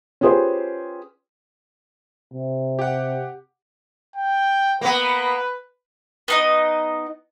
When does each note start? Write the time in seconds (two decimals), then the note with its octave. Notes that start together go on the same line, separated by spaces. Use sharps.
0.21 C#4 F4 G4 G#4 B4 C5
2.34 C3
2.79 G4 F#5
4.16 G5
4.81 A#3 B3 B4
6.28 B3 D#4 D#5